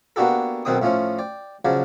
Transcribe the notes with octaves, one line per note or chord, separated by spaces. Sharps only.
A#3 B3 D4 F#4 G4 A4
B1 B2 D#3 C4 G5 D#6
A2 F3 C#4 F4
D5 G5
C#3 F3 F#3 D5